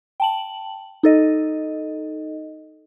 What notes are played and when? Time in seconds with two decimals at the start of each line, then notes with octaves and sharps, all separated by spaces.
0.20 G5 A5 F#7
1.03 D#4 A4 D#5